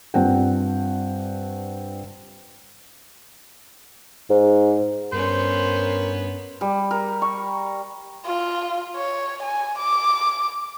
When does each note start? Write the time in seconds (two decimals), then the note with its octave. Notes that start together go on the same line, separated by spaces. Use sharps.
0.14 G2 C4 D4 F4 F#5 G5
4.30 G#2
5.12 G2 B3 C#4 A#4 C5
6.61 G3
6.91 A#4
7.22 C#6
8.26 F4
8.95 C#5
9.42 G#5
9.78 D6